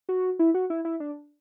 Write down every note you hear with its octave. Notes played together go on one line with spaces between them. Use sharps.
F#4
E4
F#4
E4
E4
D4